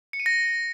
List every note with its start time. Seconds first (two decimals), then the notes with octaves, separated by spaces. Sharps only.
0.13 C#7
0.20 D#7
0.26 A#6